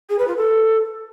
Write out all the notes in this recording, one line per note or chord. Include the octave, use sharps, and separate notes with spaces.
G#4
B4
F4
A4